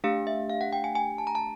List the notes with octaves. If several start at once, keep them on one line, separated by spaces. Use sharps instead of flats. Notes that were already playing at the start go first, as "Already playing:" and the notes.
A3 D4 G4 F5
E5
F5
F#5
G5
G#5
G#5
A5
A#5
A5